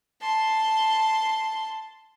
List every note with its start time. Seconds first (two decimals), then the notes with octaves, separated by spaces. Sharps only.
0.21 A5 C6